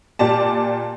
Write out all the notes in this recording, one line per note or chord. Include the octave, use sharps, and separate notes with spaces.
A#2 G4 D5 A5